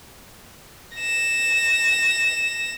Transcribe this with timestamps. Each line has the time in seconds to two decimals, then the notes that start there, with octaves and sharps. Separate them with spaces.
0.97 A#6 E7